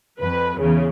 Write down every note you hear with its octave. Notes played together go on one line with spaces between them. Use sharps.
F2 B4
E2 C#3